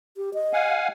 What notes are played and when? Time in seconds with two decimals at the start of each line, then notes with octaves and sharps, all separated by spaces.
0.17 G4
0.34 D#5
0.53 F5 F#5 G#5